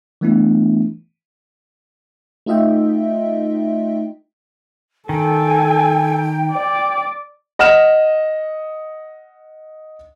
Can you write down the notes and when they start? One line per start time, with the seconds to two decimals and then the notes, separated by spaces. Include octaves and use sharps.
0.21 E3 G3 A3 B3 D4 E4
2.46 A3 D#4 F4 D#5 E5 G5
5.09 D#3 A4 G5 G#5
6.53 D5
7.59 D#5 F#5 F6 E7